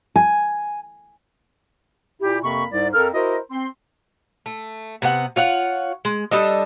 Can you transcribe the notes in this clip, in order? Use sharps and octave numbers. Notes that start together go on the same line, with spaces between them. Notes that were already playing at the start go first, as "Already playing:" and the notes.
G#5
A#2 E4 G4
F2 C3 A#3 B5 C#6
C2 G#2 D5
F2 A4 A#4 F5 F6
E4 F#4 A#4 C5 D#5
C4 C6
A3
C3 B3 G#4 F#5
F4 C#5 F#5
G#3
G3 D4 A4 D#5